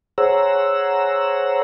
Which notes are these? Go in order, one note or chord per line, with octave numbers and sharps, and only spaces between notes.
G#4 C5 C#5 F#5 A#5 E6